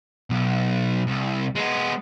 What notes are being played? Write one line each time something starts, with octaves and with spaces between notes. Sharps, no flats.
B1
C2
G#3 B3